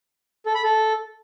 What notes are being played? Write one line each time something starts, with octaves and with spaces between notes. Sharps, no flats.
A4
B5
A4